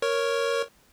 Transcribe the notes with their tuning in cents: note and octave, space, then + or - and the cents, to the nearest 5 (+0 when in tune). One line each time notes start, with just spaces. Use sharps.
A#4 +0 C#5 +0 C#6 -5